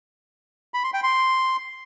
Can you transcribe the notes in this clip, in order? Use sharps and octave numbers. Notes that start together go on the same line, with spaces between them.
B5
C6
G5
C6